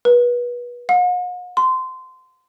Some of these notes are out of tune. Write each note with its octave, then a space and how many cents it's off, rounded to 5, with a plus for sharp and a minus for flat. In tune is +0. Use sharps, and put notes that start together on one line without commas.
B4 -30
F#5 -45
C6 -20